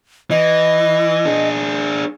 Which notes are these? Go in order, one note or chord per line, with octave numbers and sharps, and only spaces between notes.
E3 D#5
D4 G#4